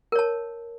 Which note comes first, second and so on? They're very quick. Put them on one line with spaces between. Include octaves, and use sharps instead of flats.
A#4 C#5 A5